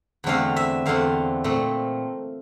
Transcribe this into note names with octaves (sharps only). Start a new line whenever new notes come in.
E2 D3 A3 C4 F5
E5
E2 D3 A3 C4 F5
A#2 A3 C4